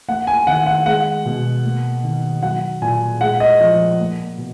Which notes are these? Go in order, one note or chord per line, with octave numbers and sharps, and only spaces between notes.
A#3 F#5
G#5
D#3 F#5
F#5
G#3 F#5
B2
A#3
D#3
F#3 F#5
A#2 G#5
G#3 F#5
D#5
F3 D#5
A#3
B2